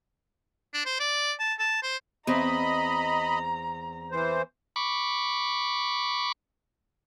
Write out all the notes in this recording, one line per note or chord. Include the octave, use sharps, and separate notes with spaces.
D4
C5
D5
A5
A5
C5
E2 C4 D#5 A#5 B5
E3 C5
B5 C#6 D6